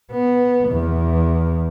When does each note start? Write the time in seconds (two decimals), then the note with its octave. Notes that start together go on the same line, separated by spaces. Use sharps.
0.12 B3
0.69 E2